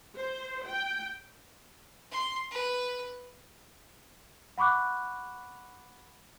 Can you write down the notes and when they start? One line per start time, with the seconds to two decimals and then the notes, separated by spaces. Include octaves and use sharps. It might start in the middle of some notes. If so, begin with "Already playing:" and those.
0.16 C5
0.65 G5
2.11 C6
2.51 B4
4.58 F#5 B5 C#6 D6 F#6